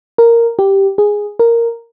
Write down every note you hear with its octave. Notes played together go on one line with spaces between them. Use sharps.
A#4
G4
G#4
A#4